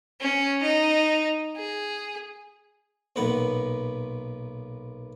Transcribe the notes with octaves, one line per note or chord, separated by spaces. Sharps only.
C#4
D#4
G#4
B1 A#2 B3 F#5